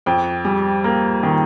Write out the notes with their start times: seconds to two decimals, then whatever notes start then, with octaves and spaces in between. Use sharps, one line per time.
0.06 F2 G5
0.45 G3
0.84 A#3
1.23 D#3